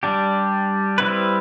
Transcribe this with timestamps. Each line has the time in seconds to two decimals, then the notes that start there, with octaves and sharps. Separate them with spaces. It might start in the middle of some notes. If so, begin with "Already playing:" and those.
0.03 G3 D4 G4
0.98 G3 C4 E4 B4